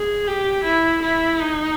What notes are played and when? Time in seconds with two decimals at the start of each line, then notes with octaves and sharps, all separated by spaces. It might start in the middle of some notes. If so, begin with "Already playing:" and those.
Already playing: G#4
0.27 G4
0.65 E4
1.03 E4
1.41 D#4